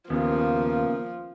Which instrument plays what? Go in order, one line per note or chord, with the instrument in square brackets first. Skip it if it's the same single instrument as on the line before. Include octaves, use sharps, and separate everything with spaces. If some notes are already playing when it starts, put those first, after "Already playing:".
[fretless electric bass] D#2 [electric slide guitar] C#3 B3 [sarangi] F3 [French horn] A#3